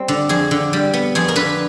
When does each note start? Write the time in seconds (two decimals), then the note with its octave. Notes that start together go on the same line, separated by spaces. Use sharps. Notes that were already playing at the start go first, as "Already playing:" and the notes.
Already playing: G3 C4
0.08 D3
0.29 F2 G#4
0.51 D3
0.73 G3
0.94 B3
1.15 F2 G#4
1.28 A#4
1.36 D3 B4